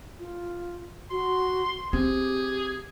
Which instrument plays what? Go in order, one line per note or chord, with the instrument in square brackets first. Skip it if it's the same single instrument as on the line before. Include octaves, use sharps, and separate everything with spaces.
[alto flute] F4
[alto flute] F#4 [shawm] C6
[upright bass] C4 [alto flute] G4 [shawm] G#4